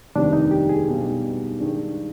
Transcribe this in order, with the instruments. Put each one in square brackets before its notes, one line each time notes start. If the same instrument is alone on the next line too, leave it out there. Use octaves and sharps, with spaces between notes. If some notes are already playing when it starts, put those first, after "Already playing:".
[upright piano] F1 D#2 D#3 G3 C4 [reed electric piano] D4
[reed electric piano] D#4
G4
G#4
[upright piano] B1 B2 G3 B3 D#4
G2 D#3 G#3 D4